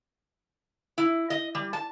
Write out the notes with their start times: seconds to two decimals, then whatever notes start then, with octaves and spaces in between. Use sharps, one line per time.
0.98 E4
1.30 D#5
1.55 G3
1.73 A5